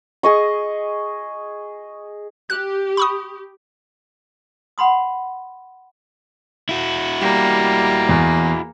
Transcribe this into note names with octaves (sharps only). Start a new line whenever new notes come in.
G#4 D#5 C#6
G4 F#6
B5 C#6 D#6
F#5 B5 C6 D#6
E4 F#4
G3 A#3
E2